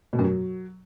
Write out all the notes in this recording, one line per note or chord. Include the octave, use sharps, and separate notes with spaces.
B2
F#2
F#3